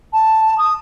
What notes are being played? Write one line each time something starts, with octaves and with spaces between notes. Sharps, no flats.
A5
D#6